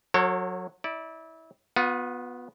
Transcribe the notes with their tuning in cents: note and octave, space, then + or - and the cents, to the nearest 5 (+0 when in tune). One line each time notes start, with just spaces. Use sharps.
F#3 -15 A4 +40 C#5 -40
E4 -25 D5 +0
B3 +0 F4 +45